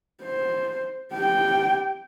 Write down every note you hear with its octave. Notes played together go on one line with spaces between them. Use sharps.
C5
G4 G5